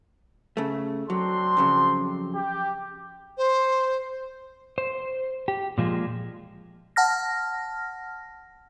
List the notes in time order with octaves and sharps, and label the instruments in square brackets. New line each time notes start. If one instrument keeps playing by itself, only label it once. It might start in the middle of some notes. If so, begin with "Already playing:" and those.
[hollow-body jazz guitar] C#3 A3
[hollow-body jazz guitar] F#3 [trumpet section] C4 D4 C6
[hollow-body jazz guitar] F2 C#3 F#3
[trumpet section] G4
[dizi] C5
[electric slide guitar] C5
G4
A#2 F3 G#3
[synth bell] F#5 A5 F6 A#6